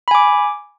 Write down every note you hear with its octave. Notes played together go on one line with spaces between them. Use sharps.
G#5 B5 D6